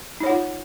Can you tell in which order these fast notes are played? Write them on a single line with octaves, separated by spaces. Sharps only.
D#4 C#5 F#5 F4